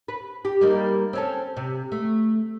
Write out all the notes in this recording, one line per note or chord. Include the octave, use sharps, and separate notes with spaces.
B4
G4
G3 A#3 D#4
C4 C#4 A4
C3
A3